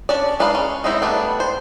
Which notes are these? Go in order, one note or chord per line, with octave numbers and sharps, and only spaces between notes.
C#4 D4 D5
G#3 D4 D#4 B4 F5
C#4
G#3 B3 C4 D#4 E4
G3 A3 B3 D4
C5